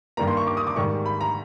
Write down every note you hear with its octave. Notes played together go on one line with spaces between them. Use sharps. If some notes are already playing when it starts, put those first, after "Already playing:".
G2 D#3 G3 A#3 A#5
C6
C#6
D6
D#6
D6
G#2 D#3 G3 C#6
B5
A#5